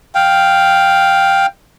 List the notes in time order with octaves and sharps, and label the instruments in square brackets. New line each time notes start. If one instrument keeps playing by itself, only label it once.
[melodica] F5 G5